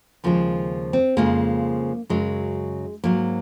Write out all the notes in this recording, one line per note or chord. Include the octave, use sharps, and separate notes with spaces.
D#2 C#3 F3 G#3
C4
F2 C#3 F3 G#3 A#3
F#2 C#3 F#3 G#3
G#2 F#3 A#3